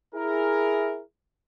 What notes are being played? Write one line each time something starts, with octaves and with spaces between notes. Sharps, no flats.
E4 G#4 A#4